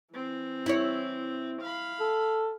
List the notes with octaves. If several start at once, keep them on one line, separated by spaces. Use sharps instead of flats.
E3 C4
E4 C#5
F5 B5
A4